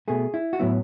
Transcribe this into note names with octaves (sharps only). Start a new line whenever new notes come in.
B2 A3 G#4
E4
F#4
A2 F#3 B3 E4